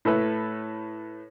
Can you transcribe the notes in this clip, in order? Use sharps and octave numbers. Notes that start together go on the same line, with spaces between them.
A2 A3 A4 B4